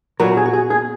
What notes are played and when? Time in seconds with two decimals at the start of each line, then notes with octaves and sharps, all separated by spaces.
0.20 A#2 F#3 B3 A#4
0.37 G#4
0.45 F#4
0.53 G#4
0.70 G#4